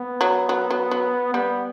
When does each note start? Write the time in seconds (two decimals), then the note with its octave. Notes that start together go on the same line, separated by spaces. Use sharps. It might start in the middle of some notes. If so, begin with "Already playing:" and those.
Already playing: B3
0.21 F#3
0.49 F#3
0.71 F#3
0.91 F#3
1.34 G3 B3